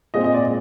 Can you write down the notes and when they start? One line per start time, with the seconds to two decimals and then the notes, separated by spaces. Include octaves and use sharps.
0.14 A#2 G#3 C4 D#5
0.24 D#5
0.34 D5